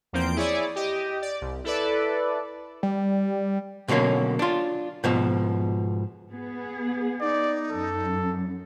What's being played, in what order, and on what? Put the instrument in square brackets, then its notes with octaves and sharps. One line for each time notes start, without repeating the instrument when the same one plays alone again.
[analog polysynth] E2 F3 A#3 C4 G6 D7
E4 G#4 C#5 D5
G4 D#5
D5
C2
E4 A4 B4 D5
[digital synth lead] G3
[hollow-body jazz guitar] B2 D3 F#3 A#3 C#4
D4 F4
G#2 B2 F3
[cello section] B3 G#4
[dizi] D#4 [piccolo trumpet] D5
[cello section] F#2 [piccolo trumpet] A4